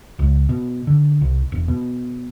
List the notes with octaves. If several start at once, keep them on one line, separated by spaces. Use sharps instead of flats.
C#2
B2
D3
C2
E1
B2